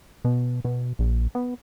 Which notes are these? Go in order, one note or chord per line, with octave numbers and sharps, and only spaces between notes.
B2
B2
A#1
B3